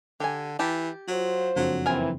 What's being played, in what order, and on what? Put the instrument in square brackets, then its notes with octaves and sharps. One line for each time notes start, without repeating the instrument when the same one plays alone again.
[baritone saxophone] D3 [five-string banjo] G4 G#5
[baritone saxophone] E3 [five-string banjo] G4 A5
[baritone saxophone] F#3 [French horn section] F4 C5
[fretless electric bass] F#1 F2 D4 [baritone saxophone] F#3
[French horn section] E3 C4 [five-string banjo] A#4 G#5